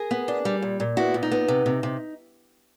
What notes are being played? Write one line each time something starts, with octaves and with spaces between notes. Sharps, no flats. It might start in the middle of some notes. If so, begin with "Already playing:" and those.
Already playing: G#4 A#4
B3
D4
G3
A#2
A#2
B3 E4 F#4
A#2
D#4
B3
C3
C3
C3